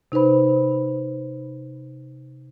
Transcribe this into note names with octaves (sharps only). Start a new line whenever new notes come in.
C3 D#4 B4 C5 B5